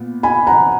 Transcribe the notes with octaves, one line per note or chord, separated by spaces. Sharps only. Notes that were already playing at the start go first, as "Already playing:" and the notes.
Already playing: A#2 B3
G#5 B5
F#5 A#5